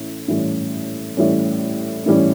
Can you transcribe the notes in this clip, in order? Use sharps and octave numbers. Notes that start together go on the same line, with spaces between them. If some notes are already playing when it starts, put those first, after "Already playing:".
Already playing: A2 E3 C#4
A2 E3 G3 C#4
A2 E3 G3 C#4
A2 E3 G3 C#4